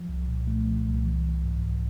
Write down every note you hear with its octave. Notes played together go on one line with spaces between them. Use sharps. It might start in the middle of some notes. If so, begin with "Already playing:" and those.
Already playing: F3
C2
A#2
A3
F3
C2
E3
A#1
G#2
A#1